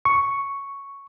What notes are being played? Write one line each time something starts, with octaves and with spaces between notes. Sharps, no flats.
C#6